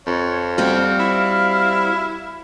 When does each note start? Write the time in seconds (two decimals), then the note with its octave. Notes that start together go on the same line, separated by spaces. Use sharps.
0.07 F2 C#5
0.58 G3 C4 F#4 F5
0.99 E4